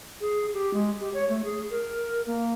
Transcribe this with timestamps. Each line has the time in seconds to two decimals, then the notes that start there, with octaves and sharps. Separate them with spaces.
0.21 G#4
0.54 G4
0.73 G#3
1.01 G4
1.14 C#5
1.29 A3
1.44 G#4
1.71 A#4
2.27 A#3